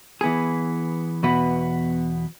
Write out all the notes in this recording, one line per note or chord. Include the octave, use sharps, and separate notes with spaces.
E3 B3 G#4
E2 B2 B3 F#4 B4